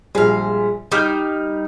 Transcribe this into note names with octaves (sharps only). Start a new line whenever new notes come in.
A#1 F3 G3 G#3 F5
G3 D#4 D6 F6 G6